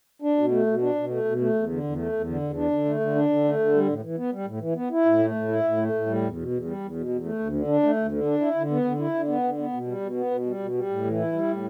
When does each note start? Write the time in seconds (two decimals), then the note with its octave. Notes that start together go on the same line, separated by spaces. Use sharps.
0.22 D4
0.38 B2
0.51 A3
0.67 B2
0.82 D4
0.95 B2
1.10 A3
1.25 B2
1.40 A3
1.54 E2
1.69 D3
1.84 E2
1.97 A3
2.12 E2
2.27 D3
2.42 E2
2.56 D4
2.71 D3
2.85 A3
3.00 D3
3.15 D4
3.29 D3
3.44 A3
3.59 D3
3.74 G3
3.88 A2
4.03 E3
4.17 B3
4.32 G3
4.46 A2
4.60 E3
4.75 B3
4.91 E4
5.05 A2
5.19 A3
5.35 A2
5.49 E4
5.64 A2
5.77 A3
5.93 A2
6.07 G3
6.22 E2
6.36 B2
6.51 E2
6.65 G3
6.80 E2
6.95 B2
7.09 E2
7.24 A3
7.39 D2
7.53 D3
7.68 D4
7.83 A3
7.96 D2
8.12 D3
8.26 D4
8.40 E4
8.55 D3
8.71 B3
8.85 D3
8.99 E4
9.15 D3
9.28 B3
9.44 D3
9.58 B3
9.73 B2
9.87 G3
10.01 B2
10.16 B3
10.31 B2
10.46 G3
10.60 B2
10.75 G3
10.89 A2
11.05 E3
11.18 E4
11.33 G3
11.47 A2